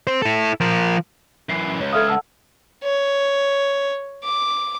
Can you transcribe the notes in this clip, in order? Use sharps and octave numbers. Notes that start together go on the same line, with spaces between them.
C4 C5
E4 A4
F3 A#4
F#2 E3 C7
C#4
C#2 C#5
A4 E5 F5 D#6 F6 G#6
F#5 A5 E6
C#5
D6